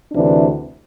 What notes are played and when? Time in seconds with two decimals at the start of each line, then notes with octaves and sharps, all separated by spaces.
0.12 D2 C3 E3 D4